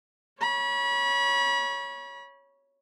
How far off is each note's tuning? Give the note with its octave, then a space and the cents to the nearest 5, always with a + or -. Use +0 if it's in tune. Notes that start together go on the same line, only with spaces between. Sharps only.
C#5 +0 B5 -35